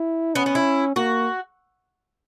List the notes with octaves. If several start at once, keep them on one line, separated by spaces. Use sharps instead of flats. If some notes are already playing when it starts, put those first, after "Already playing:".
Already playing: E4
B3 C#4
B3
E4
A#3 F#4